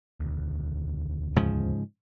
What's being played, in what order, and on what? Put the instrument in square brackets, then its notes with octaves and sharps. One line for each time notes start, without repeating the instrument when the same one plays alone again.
[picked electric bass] E1 D2
[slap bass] G#2 C#3 F3